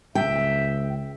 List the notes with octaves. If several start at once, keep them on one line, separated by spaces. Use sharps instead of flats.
C#2 E5 G5